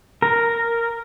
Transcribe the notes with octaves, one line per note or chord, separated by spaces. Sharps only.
A#4